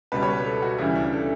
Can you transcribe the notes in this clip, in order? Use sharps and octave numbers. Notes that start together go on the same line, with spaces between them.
C#2 B2 G3 B4
C#5
B4
A4
F#4
D2 C#3 E3 G3 E4
D4
A4